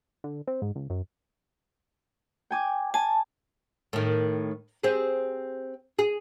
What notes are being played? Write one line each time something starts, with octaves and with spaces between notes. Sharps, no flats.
D3
C4
G#2
C#2
F#2
G5 G#5 D6
G#5 A5
A2 D#3
C4 G4 G#4
G#4